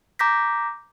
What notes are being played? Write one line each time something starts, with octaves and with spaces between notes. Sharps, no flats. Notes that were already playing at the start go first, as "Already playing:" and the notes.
A#5 D6 G6 A#6 B6